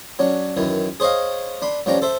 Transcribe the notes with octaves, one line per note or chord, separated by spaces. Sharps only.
F#3 C#4 D4
F#2 D#3 E3
G#4 C5 C#5 D#5 F5
D4 B5 C6
G2 F3 C#4 D4 G5 A#5
A4 C5 E5